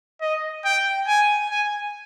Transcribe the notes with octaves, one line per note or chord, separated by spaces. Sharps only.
D#5
G5
G#5
G#5